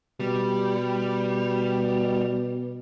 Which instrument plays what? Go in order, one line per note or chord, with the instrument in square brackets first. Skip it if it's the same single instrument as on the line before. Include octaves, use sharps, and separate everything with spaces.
[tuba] B2 [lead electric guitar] G3